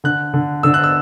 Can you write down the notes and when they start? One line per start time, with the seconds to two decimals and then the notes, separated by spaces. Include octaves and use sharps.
0.04 D3 F#6
0.34 D3
0.63 D3 E6
0.74 F#6
0.84 E6